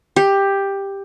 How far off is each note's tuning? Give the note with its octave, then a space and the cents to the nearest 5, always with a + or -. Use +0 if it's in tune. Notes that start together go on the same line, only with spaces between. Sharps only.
G4 +10